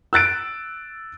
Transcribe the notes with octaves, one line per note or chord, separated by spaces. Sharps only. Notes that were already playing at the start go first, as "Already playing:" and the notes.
E6 F#6 A6 D7